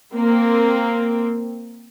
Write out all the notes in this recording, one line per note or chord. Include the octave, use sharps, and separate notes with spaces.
A#3 C4